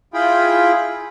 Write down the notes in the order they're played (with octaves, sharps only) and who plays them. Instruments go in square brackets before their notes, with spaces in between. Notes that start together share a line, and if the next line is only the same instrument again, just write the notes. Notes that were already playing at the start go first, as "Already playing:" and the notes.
[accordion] E4 F4 G#4 G5 B5